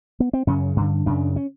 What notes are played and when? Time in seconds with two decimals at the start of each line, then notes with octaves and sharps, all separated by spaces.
0.20 B3
0.33 C4
0.47 F#2 C#3 C#4
0.76 G2 D3
1.06 F#2 C#3 D4
1.36 C#4